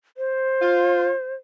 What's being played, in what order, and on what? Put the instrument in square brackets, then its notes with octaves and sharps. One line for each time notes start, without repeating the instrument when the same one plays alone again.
[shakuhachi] C5
[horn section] F4